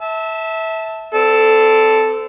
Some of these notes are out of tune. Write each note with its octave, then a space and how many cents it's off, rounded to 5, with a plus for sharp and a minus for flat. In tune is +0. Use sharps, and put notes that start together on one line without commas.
E5 -20 A5 +0
C4 -30 A4 +0 D5 -25